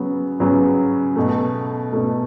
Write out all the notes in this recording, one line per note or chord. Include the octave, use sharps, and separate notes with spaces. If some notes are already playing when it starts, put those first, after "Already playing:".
Already playing: C#3 F#3 B3
C#3 F#3 B3
B2 A3
B2 A3